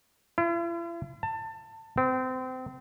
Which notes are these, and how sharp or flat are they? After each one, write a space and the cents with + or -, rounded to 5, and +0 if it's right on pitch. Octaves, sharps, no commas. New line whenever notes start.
E4 +45
A5 +25
C4 -30